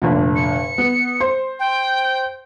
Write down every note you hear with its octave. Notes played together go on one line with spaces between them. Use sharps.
F1 A#2 D3
C#7
B3
C5
G5